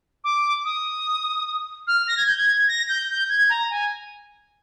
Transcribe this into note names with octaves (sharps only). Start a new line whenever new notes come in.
D6
D#6
F6
A#6
G#6
G6
G#6
A#6
G6
G6
G#6
A#5
G#5